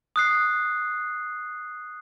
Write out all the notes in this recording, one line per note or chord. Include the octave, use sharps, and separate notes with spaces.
D#6 F#6 C7